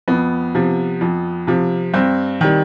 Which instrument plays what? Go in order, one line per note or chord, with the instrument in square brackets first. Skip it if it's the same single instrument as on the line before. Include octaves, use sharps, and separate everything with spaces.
[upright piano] F2 B3
C3 F3
F2
C3 F3
G2 C4
D#3 G3